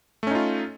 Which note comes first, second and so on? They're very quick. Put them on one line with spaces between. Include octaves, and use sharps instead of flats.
A3 C#4 D#4 F4